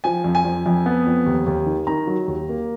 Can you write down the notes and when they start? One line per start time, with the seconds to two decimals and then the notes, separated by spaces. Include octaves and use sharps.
0.04 F3 G#5
0.24 F2
0.35 G#5
0.45 F2
0.66 F2
0.86 B3
1.06 F2
1.26 D#2
1.46 D#2
1.66 D#3
1.87 D#3 A#5
2.07 F#3
2.28 D#2
2.49 A#3